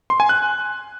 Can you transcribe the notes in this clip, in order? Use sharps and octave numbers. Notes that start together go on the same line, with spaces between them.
C6
G#5
F#6